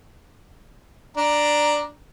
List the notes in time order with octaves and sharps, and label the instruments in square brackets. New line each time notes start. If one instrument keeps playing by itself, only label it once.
[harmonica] D4 A#5